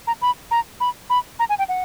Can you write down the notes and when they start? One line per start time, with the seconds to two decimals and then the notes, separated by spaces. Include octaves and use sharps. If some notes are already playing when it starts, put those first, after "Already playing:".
0.07 A#5
0.22 B5
0.51 A#5
0.80 B5
1.10 B5
1.39 A#5
1.49 G#5
1.58 G5
1.69 F#5